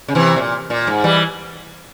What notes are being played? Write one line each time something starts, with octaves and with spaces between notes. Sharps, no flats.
C#3
C3 E3
A#2
A#2
G#2
E3 G3